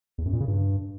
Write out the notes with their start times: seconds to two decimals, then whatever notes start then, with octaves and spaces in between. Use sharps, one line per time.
0.18 E2
0.26 F#2
0.33 A#2
0.40 C#3
0.48 G2